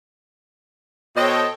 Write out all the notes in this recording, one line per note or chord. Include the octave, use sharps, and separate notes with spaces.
B2 A4 C5 C#5 D#5 G5